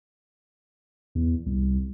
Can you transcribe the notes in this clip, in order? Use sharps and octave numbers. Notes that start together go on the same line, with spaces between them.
E2
C2